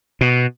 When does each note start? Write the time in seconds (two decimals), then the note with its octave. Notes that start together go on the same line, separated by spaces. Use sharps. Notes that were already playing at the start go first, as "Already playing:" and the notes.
0.21 B2